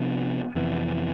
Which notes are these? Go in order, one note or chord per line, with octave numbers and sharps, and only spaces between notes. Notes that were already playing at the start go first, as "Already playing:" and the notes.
Already playing: C3 F3 B3 D4
F2 C3 E3 B3